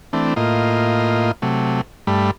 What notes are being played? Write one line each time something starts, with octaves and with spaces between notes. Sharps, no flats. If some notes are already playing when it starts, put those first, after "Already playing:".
E3 A3 C4 D4
A2 A#3 F4 D#5
C3 F#3 A3
G2 G3 A3 B5